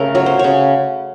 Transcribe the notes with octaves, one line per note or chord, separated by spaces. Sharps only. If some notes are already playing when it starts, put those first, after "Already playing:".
Already playing: C#3 A3 A#4
F#3 C#5
C5
C#3 C#5